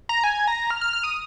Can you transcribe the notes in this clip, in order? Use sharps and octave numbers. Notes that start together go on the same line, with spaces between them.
A#5
G#5
A#5
F6
F6
F6
D#6